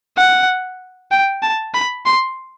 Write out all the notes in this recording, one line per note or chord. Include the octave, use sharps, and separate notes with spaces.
F#5
G5
A5
B5
C6